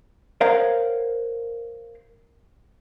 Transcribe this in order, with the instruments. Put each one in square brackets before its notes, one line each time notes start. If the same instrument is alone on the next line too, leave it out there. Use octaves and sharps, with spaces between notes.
[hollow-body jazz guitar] A#4 C5 C#5 F5 F#5 A#5